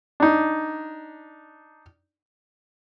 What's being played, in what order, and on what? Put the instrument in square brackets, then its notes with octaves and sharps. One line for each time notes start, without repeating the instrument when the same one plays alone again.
[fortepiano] D4 D#4